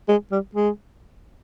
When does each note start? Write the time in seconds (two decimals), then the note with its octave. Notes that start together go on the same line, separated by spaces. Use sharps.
0.08 G#3
0.32 G3
0.55 G#3